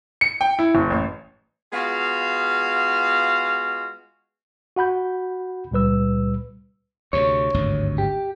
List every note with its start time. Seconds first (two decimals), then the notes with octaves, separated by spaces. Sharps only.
0.21 C#7
0.41 G5
0.59 E4
0.75 F#1
0.90 A1
1.73 G#3 B3 F4 F#4 F5
4.76 F#4 F#5 B5 G6
5.71 C#2 A#2 G3 B4 E6
7.13 D2 C3 C#5
7.54 G#1 D2 G2
7.98 G4